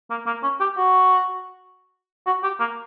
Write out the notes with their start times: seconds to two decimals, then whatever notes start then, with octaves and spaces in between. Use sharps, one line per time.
0.10 A#3
0.26 A#3
0.43 C#4
0.60 G4
0.77 F#4
2.27 F#4
2.43 G4
2.60 A#3